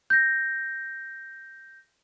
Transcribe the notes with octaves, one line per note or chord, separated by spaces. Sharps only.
G6 A#6